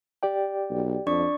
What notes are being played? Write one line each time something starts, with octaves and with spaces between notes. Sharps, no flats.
G4 D5 G5
B1
F2 D4 D5 C#6